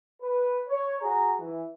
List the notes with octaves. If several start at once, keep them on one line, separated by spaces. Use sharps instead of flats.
B4
C#5
F#4 G#4 A#5
E3